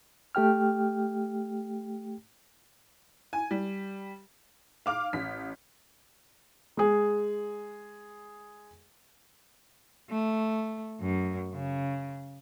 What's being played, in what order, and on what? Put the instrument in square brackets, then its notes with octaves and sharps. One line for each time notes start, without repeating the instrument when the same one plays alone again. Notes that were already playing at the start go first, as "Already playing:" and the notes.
[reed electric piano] A3 G4 G5 F6
[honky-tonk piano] G#5
G3
F5 D6 F6
A1 B6
[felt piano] G#3 G#4
[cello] A3
F#2
C#3